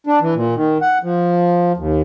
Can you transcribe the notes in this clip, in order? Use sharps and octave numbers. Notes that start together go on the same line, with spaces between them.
D4
E3
A#2
D#3
F#5
F3
D#2